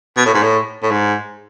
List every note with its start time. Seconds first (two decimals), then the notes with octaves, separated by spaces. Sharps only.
0.17 B2
0.26 A2
0.34 G#2
0.43 A2
0.83 A2
0.91 G#2